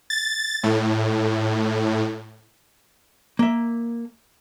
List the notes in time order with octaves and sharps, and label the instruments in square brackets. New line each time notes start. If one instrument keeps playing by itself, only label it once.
[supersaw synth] A6
A2
[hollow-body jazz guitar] A#3 E5